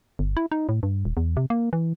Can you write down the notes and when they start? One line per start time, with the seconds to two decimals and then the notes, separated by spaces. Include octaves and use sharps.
0.19 G1
0.37 E4
0.52 D#4
0.69 A2
0.83 G2
1.05 D#1
1.17 E2
1.37 C3
1.50 A#3
1.73 E3